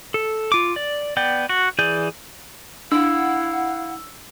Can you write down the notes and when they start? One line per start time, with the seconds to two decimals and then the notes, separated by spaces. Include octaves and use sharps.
0.14 A4
0.52 F4 D6
0.76 D5
1.17 B3 D5 G5
1.49 F#4
1.79 E3 G#4 D5 G6
2.92 D4 E4 F5 F#5 E6